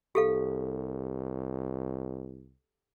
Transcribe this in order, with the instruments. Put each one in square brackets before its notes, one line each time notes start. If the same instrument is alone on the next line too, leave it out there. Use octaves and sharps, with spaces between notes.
[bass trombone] C2 [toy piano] G4 A4 F5